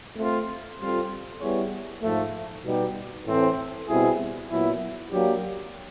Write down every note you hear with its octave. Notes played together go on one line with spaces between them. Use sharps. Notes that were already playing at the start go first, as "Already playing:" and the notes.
A3 C4 F4
G3 C4 F4 A4
G3 B3 E4 G#4 C#5
G#2 F3 A3
B2 G3 B3 D#4 G4
A2 E3 A3 C4
B2 G3 C4 E4 G#4
A#2 F#3 B3 E4
F#3 A#3 D4 G4